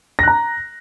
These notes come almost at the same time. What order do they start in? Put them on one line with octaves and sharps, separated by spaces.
A#6 F#6 A#5